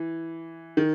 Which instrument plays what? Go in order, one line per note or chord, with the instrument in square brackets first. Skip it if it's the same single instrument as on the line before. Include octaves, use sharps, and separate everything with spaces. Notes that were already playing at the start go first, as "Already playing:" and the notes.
Already playing: [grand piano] E3
D#3